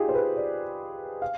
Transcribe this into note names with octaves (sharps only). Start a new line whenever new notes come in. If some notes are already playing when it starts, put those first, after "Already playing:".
Already playing: D#4 F4 G4 G#4
C5
B4
D5
F5